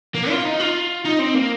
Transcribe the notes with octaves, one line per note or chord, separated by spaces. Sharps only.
A#3
F4
D#4
F4
D#4
C4
A#3